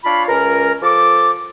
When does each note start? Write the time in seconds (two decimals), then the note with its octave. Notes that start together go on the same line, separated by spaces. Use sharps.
0.04 D4 F4 C#5 F5 B5
0.28 C#2 C#4 A#4
0.82 F3 A4 D6